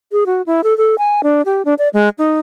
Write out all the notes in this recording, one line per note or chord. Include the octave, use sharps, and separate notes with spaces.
G#4
F#4
E4
A4
A4
G#5
D4
G4
D4
D5
G#3
D#4